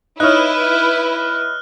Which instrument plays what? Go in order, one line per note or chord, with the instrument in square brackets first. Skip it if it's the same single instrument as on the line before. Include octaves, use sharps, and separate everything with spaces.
[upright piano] D#4 C#5 [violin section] E4 B4 [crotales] F6 F#6